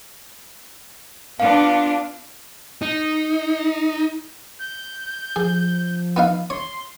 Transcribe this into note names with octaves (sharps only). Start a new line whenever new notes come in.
B3 D4 F4 F5
D#4
G6
F3 G#4
B3 D#4 F5
C#5 C6